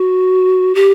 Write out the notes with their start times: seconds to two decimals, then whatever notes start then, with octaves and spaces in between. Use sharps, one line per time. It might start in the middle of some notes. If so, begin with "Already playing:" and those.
Already playing: F#4
0.75 G4